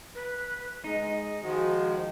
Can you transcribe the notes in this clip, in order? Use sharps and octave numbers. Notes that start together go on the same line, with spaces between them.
B4
G#3 D#4 D#5
D#3 F3 G#3 F#4